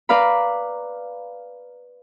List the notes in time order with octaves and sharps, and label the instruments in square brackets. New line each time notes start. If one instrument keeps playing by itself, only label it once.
[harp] B4 D5 F5 A#5 B5